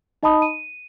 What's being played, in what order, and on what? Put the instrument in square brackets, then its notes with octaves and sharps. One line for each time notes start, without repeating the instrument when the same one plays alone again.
[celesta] D#4 D#5 A5 B5 D#6
D#7